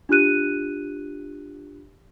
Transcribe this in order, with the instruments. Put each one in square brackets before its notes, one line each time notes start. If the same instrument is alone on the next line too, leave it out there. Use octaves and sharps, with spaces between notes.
[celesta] D4 F4 G4 F#6 D#7